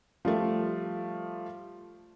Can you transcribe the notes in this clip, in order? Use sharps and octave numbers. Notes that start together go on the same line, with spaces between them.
F3 G3 A3